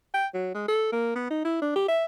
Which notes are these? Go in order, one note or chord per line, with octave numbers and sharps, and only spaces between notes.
G5
F#3
G#3
A4
A#3
B3
D#4
E4
D4
G4
E5